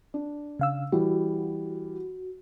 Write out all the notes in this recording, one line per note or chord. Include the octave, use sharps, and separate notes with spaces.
D4
C#3 F5 E6
E3 G3 F#4